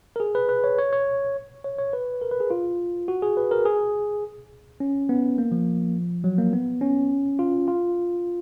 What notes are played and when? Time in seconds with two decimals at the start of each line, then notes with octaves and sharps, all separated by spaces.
0.16 A#4
0.20 G#4
0.35 B4
0.49 B4
0.64 C#5
0.78 C#5
0.93 C#5
1.64 C#5
1.78 C#5
1.93 B4
2.22 A#4
2.31 B4
2.40 G#4
2.50 F4
3.08 F#4
3.22 G#4
3.37 B4
3.51 A#4
3.65 G#4
4.80 C#4
5.09 B3
5.38 A#3
5.52 F3
6.24 F#3
6.38 A#3
6.53 B3
6.81 C#4
7.39 F4
7.68 F4